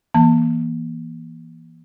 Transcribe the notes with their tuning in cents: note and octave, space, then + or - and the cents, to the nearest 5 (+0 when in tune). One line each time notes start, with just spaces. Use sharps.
E3 +0 A#3 +30 A5 +25